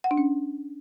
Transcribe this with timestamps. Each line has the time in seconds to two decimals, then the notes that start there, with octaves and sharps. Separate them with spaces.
0.04 F#5
0.11 D4
0.17 C#4